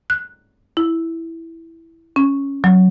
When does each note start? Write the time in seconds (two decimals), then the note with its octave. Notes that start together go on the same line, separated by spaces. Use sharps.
0.10 F#6
0.77 E4
2.16 C#4
2.64 F#3